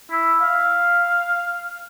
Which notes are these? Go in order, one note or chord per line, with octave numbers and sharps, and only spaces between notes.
E4
F5